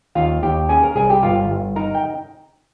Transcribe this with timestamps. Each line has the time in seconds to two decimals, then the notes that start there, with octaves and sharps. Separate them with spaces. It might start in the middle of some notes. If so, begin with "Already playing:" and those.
0.15 D#2 F4 F5
0.43 D#2 G4 G5
0.69 C#4 G#4 G#5
0.83 A#4 A#5
0.96 C2 G#4 G#5
1.09 G4 G5
1.23 G1 F4 F5
1.49 G1
1.76 D#4 A#4 A#5
1.95 G5